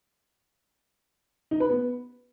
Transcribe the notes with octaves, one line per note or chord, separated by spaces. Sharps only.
D#4
B4
B3